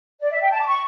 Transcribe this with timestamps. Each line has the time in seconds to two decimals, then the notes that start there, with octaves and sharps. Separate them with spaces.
0.21 D5
0.31 E5
0.42 G5
0.51 A5
0.60 D6
0.67 C#6